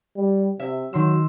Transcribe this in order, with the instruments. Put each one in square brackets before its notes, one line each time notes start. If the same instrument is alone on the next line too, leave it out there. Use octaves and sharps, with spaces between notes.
[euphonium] G3
[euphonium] C3 [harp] E5
[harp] D#3 C6 E6 [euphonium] F#3